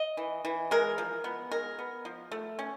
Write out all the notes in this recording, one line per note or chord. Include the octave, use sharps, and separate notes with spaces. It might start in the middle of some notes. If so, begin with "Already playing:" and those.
Already playing: D#5
E3
E3
G#3 A#4
F3
B3
G#3 A#4
B3
F3
A3
C#4